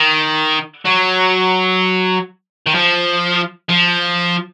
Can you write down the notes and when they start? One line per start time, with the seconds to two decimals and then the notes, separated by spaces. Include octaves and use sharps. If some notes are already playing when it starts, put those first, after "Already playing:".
Already playing: D#3
0.85 F#3
2.66 D#3
2.74 F3
3.69 F3